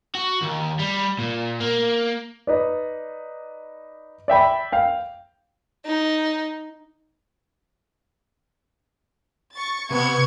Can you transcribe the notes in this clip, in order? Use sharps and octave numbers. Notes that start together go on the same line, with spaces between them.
F#4
D#2
G3
A#2
A#3
D#4 B4 D5
D5 E5 G5 B5
F5 G5
D#4
C#6 A6
C3 B3 C#6 G#6